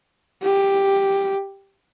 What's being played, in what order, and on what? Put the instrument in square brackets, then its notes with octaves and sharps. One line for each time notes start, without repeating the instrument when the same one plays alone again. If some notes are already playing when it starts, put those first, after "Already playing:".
[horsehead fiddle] G4